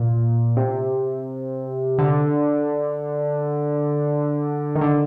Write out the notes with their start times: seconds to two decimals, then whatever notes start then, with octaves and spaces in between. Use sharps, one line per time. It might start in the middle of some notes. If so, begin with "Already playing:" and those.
Already playing: A#2
0.57 C3
1.99 D3
4.75 D#3
4.81 D3